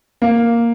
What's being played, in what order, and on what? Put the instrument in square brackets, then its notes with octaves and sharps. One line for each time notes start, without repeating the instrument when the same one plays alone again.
[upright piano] A#3